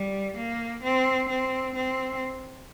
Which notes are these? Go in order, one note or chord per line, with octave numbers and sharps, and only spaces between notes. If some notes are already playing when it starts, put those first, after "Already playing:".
Already playing: G3
A#3
C4
C4
C4